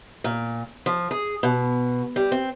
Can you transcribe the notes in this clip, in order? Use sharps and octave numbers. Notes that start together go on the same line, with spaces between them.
A#2
F3
G#4
B2
G3
C4